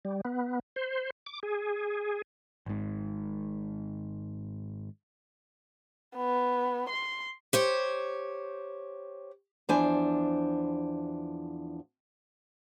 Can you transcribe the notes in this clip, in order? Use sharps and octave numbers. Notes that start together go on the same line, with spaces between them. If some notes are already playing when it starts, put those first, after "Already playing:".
G3
B3
C5
D6
G#4
G#1 G#2
B3
C6
G4 C5 C#5
E2 F3 D4 E4 C5 G#5